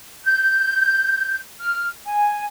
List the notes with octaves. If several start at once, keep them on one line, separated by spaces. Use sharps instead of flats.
G6
F6
G#5